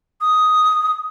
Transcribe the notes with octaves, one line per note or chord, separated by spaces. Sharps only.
D#6